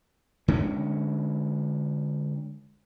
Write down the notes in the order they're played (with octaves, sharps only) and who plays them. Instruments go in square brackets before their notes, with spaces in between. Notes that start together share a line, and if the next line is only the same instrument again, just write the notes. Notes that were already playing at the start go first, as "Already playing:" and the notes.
[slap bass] D3 G#3 C#4